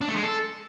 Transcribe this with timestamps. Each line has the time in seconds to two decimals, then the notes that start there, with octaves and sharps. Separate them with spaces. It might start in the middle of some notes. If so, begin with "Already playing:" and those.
0.01 D4
0.08 A3
0.16 G#3
0.23 A4